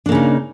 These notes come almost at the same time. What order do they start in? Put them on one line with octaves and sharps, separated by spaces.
D4 A#3 C#3 D#4